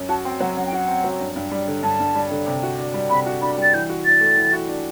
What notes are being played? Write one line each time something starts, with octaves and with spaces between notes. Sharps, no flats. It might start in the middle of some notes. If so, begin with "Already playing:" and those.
Already playing: F#2
F#4 A5
C4 G5
F#3 F#5
F#2 F#5
G5
F#4 F#5
C4
F#3
G2
G2
G3
D3
G2 A5
G2
G3
D3
C3
F#4
D4
G3
C3 B5
F#4
D4 B5
G3 A6
E3 G6
F#4
D4 A6
A3
E3
F#4
D4